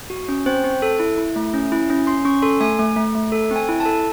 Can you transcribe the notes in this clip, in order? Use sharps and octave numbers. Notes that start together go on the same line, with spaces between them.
F#4
C#4
C4 C5
C4
A4
E4
E4
A3
C#4
E4
C#4
C#4 C6
C#4 C#6
A4 C6
A3 G#5
A3
A3
A3
A4
C4 G#5
E4
A5
A4